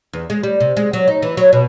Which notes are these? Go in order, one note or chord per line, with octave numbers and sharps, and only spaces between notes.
E2
G#3
G3
C3
G#3
F#3
D#4
E3
F#3
B2